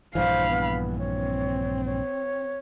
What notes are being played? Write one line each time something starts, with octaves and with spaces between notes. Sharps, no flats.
A#1 G2 E3 C5 F5 B5
B3
C4 C#5
C#5